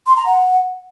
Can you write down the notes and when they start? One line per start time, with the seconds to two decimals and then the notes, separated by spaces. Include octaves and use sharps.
0.06 C6
0.16 A#5
0.26 F#5